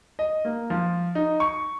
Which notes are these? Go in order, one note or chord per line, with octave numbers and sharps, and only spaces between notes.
D#5
A#3
F3
D#4
C#6